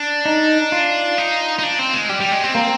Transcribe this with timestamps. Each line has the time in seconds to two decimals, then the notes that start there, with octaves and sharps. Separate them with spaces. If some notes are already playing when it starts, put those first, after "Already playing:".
Already playing: D4
0.25 D#4
0.72 F4
1.18 D#4
1.59 D#4
1.63 D4
1.79 C4
1.94 G#3
2.09 G3 G4
2.21 G3
2.32 G#3
2.44 C4
2.55 A#3